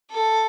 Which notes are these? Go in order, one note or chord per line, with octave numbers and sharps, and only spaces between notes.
A4